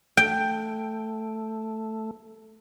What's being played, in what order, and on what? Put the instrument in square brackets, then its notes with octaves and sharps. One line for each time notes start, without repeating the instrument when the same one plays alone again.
[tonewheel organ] A3 [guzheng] G5